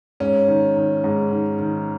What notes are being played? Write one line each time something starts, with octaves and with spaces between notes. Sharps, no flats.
G#2 C#4
D#3
D#3
G#2
D#3
D#3